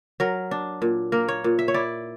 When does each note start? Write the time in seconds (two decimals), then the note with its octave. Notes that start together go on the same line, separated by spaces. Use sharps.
0.20 F#3 A#4
0.51 D4
0.82 A#2
1.12 A#3 A#4
1.28 C#5
1.44 A#2
1.59 E5
1.68 C#5
1.74 E4 D5